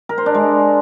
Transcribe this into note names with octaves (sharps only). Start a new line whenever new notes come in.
A#4
C5
D4
G#3